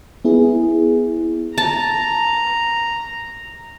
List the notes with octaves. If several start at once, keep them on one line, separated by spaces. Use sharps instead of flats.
B3 E4 G#4
A5 A#5